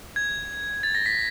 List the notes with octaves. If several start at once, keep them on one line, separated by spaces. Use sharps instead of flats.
G#6
A6
A#6
B6